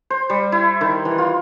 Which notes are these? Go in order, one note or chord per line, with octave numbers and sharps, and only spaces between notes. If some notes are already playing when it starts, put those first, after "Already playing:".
C5
G3
E4
D#3
E3
F4